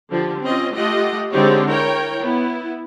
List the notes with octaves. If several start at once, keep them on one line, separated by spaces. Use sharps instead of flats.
D3 F3 G4
C4 C#4 F4 D#5
A3 F4 G4 D#5 F#5
D3 G#3 C4 D#4 G4 C#5
E4 A#4 C#5 G5
B3 E4